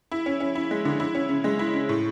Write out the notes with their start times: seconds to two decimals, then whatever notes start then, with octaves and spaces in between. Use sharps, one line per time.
0.11 E4
0.26 C#4
0.40 C#4
0.55 E4
0.71 G#3
0.85 D3
1.00 E4
1.15 C#4
1.29 C#3
1.44 G#3
1.59 E4
1.73 C#3
1.89 A2